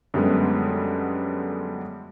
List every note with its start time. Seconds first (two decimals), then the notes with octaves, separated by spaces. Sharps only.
0.14 F#2 D3 G3 G#3 B3